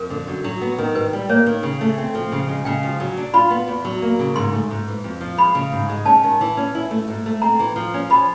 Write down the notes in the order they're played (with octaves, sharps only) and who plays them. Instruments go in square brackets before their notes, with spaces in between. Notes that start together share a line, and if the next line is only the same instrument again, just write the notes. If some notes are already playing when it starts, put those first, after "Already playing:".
Already playing: [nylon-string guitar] F2 [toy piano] A#4
[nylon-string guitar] D3
F#2
F#3
B3
D#3
[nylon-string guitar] G#2 [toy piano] B4
[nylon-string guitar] G3
[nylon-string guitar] A#3 [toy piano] C#5
[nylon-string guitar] D#3
C#3
A3
C4
F3
C#3
G#3
[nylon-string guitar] C#3 [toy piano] G5
[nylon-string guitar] F3
F#3
D4
[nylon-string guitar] F4 [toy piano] B5
[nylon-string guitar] B3
E2
F#3
A#3
C#3
[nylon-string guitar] G#2 [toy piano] C6
[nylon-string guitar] A3
G#2
E3
F2
F3
[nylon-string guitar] G#3 [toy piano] B5
[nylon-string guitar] C#3
G#2
G#3
[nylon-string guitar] C#4 [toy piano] A5
[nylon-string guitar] D#3
E3
C#4
E4
A3
G#2
A3
[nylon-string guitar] C4 [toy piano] A#5
[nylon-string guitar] E3
F3
C#4
[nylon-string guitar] F3 [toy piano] B5